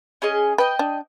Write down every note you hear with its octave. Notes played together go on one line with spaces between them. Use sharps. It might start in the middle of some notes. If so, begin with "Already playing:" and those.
C#4 G#4 D#5
B4 D#5 G5
D4